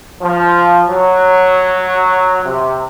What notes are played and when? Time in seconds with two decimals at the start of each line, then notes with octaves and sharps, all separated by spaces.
0.21 F3
0.89 F#3
2.46 C3